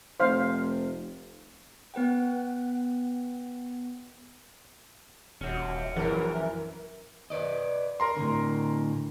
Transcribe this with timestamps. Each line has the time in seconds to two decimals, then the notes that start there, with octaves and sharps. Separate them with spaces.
0.20 F1 C5 F5
1.94 B3 B4 F#5 G5
5.41 D#1 C#4 F#4
5.96 A#1 F#2 E3 A#4
7.30 B4 D5 D#5
8.00 A#4 A#5 C6
8.17 A2 D3